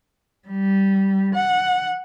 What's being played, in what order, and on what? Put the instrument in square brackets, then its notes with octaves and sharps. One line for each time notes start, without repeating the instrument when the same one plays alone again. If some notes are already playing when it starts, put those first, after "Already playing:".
[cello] G3
F#5